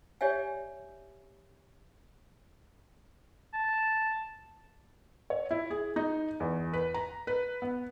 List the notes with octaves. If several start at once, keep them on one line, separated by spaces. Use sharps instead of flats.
G4 C#5 D5 E5 G#5
A5
C#5
E4
G#4
D#4
E2
B4
A#5
B4
B3